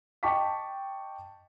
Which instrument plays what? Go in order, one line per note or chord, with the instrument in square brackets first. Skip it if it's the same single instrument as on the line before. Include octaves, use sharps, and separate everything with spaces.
[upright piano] D#5 G5 A5 C#6 D6 B6